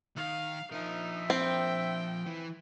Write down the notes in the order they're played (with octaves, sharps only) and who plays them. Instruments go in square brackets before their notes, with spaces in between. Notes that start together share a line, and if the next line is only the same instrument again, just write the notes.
[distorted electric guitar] D#3 D#4 [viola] F5
[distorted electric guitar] F3 A#4 [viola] D#4 [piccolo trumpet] E5
[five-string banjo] C4 [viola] G5
[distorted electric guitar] E3